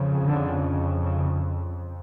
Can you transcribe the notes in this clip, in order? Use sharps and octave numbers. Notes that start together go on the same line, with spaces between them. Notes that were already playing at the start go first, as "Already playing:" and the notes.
Already playing: F2 C#3
D3
C#3